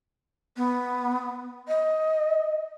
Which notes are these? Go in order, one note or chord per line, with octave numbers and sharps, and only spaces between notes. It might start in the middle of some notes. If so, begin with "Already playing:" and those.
B3
D#5